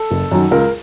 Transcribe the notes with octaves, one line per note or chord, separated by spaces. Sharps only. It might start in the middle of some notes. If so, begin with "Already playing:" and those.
Already playing: A4
F#1
F#2 D#3 F#3
C#2 A#4